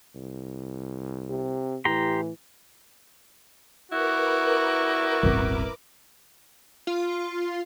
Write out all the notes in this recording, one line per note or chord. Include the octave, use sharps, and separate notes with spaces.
C2
C3
A2 E3 G4 A#5 C6
E4 F#4 A#4 B4 D6
D#1 G#1
F4